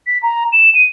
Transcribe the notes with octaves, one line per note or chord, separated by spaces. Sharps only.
B6
A#5
E7
D#7